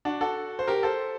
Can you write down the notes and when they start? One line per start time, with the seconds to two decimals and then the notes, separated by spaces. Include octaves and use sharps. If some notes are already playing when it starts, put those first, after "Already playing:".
0.05 D4 F#4
0.21 F#4 A4
0.59 C5
0.68 G4 A#4
0.83 A4 C5